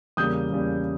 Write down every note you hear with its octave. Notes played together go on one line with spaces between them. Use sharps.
E2 C#3 G3 A#3 D#6 G6
E2 C#3 G3 A#3